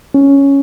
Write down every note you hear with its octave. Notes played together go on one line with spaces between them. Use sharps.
C#4